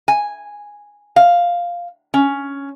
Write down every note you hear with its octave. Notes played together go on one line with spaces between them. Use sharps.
G#5
F5
C#4